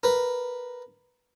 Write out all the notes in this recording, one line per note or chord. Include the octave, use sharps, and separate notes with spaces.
A#4 B4